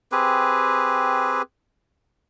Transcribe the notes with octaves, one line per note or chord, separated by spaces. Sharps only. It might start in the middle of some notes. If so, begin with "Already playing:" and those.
C4 G4 G#4 B4